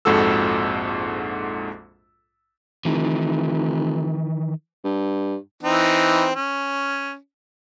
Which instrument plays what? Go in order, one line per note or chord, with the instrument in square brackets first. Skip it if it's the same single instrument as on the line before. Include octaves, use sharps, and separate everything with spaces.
[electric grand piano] A#1 F2 G#2 F#4 A4 E6
[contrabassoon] F1 [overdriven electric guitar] D#3 E3
[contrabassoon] G2
[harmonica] E3 C4 D#4
C#4